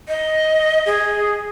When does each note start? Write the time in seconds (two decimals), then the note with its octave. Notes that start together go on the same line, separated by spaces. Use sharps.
0.08 D#5
0.86 G#4